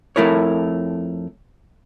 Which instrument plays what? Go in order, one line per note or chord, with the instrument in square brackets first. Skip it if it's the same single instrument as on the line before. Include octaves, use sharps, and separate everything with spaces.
[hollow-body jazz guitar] F2 A3 E4 A#4 C#5